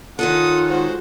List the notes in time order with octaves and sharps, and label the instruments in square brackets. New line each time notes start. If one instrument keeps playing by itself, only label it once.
[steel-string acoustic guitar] D#3 C#4 A4 [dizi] F4 [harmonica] F#5 [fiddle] D#6
[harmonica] G#3 F#4 [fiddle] C5